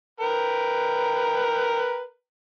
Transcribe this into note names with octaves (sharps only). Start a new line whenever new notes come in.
A#4 B4 G5